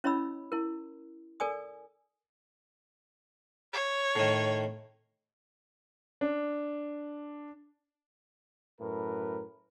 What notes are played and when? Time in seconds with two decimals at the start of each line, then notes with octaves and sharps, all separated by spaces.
0.04 C#4 E4 C#5 D#5 B5 E6
0.52 E4 A#4
1.40 A4 A#4 D5 G#5 D#6
3.73 C#5
4.15 A2 D#3
6.21 D4
8.80 F#2 A2 A#4 B4